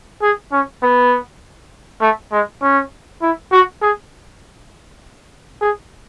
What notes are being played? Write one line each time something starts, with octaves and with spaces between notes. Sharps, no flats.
G#4
C#4
B3
A3
G#3
C#4
E4
F#4
G#4
G#4